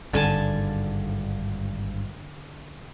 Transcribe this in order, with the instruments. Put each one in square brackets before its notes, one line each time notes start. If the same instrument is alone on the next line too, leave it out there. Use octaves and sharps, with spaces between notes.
[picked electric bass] G#1 G2 [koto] D3 G#5 A5